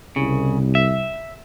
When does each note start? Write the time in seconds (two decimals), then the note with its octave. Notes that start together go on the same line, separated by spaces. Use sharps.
0.16 C2 C#3
0.75 E5